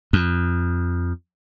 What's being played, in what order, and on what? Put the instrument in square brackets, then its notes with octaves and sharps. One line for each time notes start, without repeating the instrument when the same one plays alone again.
[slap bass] F2